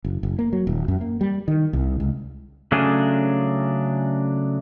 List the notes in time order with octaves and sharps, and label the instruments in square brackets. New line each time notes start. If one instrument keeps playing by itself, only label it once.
[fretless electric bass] F#1
F#1
A#3
F#3
D#1
F#2
A#3
G3
D#3
C2
C#2
[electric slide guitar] C#3 F#3 A3 C#4 D4 G#4